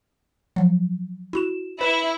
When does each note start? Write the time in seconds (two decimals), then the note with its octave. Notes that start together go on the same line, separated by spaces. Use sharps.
0.56 F3 F#3
1.33 E4 F#4 E7
1.81 E4 B4